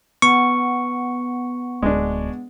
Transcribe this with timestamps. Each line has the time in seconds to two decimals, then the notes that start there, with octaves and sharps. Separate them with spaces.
0.22 B3 C#6
1.83 D1 G#3 D4